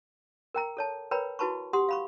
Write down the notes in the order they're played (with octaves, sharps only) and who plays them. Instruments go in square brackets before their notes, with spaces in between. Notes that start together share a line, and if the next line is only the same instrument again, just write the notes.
[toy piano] A#4 G5 A#5
A4 C#5 A5
A#4 B4 C#5 G5 A#5 B5
E4 F#4 B4 A5 B5 C#6
G4 F#5 C6 D#6
F5 B5 C#6